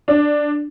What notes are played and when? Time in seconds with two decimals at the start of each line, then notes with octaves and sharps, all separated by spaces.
0.08 D4